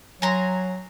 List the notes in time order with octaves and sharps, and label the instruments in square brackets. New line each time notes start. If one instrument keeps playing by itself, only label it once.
[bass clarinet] F#3 [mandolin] G#5 A#5 C6